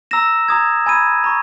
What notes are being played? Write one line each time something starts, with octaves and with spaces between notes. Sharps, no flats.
A#5 E6 A#6 E7
A#5 D#6 G#6
G#5 B5 E6 G#6 D#7
A#5 C#6